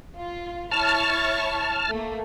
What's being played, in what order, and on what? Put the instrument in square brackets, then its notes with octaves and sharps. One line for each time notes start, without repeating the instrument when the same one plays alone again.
[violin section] F4
[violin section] E4 C#5 C#6 [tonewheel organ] A5 F6
[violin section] A3 A#3